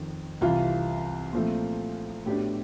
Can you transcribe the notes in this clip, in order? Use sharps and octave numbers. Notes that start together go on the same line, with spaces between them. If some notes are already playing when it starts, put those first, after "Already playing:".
Already playing: F2 D#3
C2 C3 E3 F4
A#2 F3 A3 C4
A2 F#3 B3 D4 G4